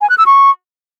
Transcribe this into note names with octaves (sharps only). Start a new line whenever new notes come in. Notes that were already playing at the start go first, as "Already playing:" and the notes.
G#5
F#6
E6
C#6